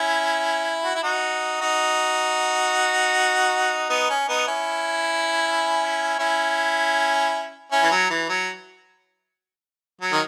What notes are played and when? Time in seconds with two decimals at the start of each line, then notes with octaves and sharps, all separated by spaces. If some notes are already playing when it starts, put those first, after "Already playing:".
Already playing: C#4 E4
0.85 F#4
0.95 E4
1.03 D#4 F#4
1.61 D#4 F#4
3.90 B3 D#4
4.10 C#4
4.28 B3 D#4
4.47 C#4 E4
6.19 C#4 E4
7.71 C#4 E4
7.83 E3
7.91 F#3
8.10 E3
8.29 F#3
10.01 F#3
10.12 D#3